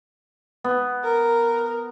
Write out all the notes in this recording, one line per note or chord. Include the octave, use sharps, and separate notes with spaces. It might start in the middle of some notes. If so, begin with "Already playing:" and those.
B3
A#4